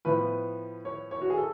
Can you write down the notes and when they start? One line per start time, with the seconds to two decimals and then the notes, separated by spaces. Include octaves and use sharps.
0.05 A2 F3 B3 B4
0.85 C#5
1.11 C#5
1.22 F#4
1.30 G#4
1.38 A4